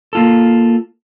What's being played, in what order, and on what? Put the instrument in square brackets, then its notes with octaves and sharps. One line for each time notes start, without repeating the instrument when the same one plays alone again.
[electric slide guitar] A#3 F4 A4